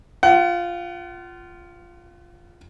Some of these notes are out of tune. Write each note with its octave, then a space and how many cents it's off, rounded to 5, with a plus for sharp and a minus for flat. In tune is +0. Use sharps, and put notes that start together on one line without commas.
F4 -5 F#5 +35